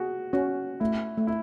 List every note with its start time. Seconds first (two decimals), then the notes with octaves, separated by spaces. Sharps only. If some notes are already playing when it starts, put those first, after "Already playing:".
Already playing: F#4 G#4
0.33 C#4 F#4
0.80 A3 E4
1.17 A3
1.27 E4